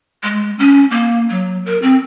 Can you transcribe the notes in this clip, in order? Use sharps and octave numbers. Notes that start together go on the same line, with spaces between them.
G#3
C#4
A#3
F#3
A#4
C4